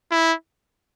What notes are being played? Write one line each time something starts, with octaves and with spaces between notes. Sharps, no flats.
E4